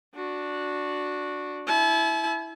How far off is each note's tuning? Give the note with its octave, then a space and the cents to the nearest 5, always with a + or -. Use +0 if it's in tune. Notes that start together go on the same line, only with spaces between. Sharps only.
D4 +0 F#4 -15
E4 -5 A5 -45